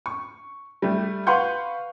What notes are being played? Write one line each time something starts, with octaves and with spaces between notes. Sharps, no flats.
C#6
G3 A3
B4 F5 F#5 C6 C#6 G6